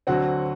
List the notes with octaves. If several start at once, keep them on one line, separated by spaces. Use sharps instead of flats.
D2 D3 F#3 C4 F#4 F#5